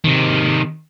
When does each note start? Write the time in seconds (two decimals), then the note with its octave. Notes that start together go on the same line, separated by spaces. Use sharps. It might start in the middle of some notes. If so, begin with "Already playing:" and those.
0.04 C3 D#3